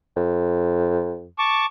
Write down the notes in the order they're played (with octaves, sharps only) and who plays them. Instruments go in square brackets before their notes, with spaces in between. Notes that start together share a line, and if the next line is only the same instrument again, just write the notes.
[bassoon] F2
[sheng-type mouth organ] A5 C#6 D6